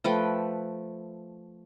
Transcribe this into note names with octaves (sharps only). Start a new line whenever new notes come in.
F3 A3 B4 G5